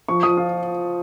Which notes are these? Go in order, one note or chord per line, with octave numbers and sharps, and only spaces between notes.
F3 C#6
F3 D#6
F4